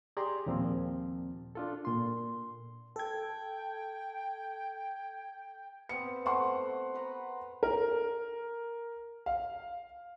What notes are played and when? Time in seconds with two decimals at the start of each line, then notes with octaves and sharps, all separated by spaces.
0.17 G4 G#4 D5 A#5 C6
0.46 D#2 A#2 F3 C4
1.55 D4 F4 A4
1.85 A#2 C6
2.96 A4 G5 G#6
5.89 B3 C4 C#7
6.26 A3 F#5 C6
6.94 A#4 B4 A#5
7.63 A#4
9.26 F5